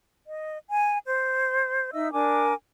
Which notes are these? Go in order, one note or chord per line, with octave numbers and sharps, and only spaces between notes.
D#5
G#5
C5
D#4 D#5 E5 E6
D4 A#4 G#5 D6